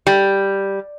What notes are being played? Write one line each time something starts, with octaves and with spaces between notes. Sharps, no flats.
G3